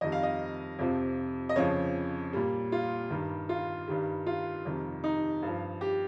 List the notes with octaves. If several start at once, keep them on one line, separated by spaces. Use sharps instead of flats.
F2 D#3 G3 D#5
F5
D#5
F2 C3 F3
D#5
F2 C#3 F3 C#5
A#2 G3
F4
G2 D#3 G3
F4
G2 D#3 G3
F4
F2 C3 D#3 G3
D#4
G2 F3
G4